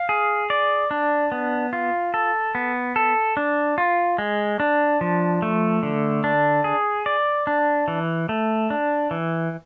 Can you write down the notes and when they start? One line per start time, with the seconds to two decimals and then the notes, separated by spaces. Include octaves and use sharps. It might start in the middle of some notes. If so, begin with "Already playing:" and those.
Already playing: F5
0.09 G#4
0.50 D5
0.91 D4
1.32 B3
1.73 F4
2.14 A4
2.55 B3
2.96 A4
3.37 D4
3.78 F4
4.18 G#3
4.60 D4
5.01 F3
5.42 A3
5.83 D3
6.24 D4
6.64 G#4
7.06 D5
7.47 D4
7.88 E3
8.29 A3
8.70 D4
9.11 E3